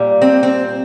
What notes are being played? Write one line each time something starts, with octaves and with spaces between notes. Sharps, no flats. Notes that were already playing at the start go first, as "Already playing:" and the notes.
Already playing: A#2 G3
C4
C4